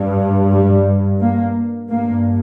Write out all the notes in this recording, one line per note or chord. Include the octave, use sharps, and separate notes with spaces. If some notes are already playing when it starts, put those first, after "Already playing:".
Already playing: G2
G3
A#3
G2 A#3